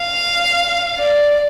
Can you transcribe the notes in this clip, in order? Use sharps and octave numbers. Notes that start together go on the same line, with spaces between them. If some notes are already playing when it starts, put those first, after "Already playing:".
Already playing: F5
D5